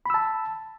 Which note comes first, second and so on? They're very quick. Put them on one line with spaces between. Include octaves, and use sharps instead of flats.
B5 E6 A5